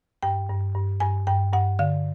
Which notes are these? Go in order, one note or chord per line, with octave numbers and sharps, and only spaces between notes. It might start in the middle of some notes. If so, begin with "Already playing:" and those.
G2 G5
G2
G2
G2 G#5
G2 G5
G2 F#5
D3 F5